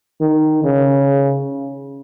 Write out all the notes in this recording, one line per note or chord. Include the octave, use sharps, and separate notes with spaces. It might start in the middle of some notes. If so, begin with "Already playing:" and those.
D#3
C#3